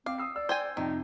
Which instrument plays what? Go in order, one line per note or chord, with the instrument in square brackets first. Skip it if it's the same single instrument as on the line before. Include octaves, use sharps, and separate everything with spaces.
[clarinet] C4 [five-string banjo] F5 [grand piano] D6
[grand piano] D#6 E6 C7
[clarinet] D5 [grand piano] E6
[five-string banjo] C5 G5 G#5
[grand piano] F2 C3 [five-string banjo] D#3 [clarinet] D#4